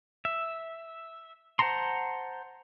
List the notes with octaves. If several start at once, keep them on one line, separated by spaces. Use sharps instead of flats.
E5
C5 F#5 A5 A#5 C6